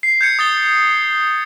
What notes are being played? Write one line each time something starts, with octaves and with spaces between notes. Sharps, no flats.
C7
G6 G#6 C#7
D#6 A6 G7